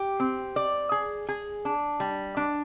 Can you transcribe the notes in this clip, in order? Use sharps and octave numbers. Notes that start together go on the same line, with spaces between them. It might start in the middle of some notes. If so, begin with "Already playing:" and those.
Already playing: G4
C4
D5
G#4
G#4
D4
G3
D4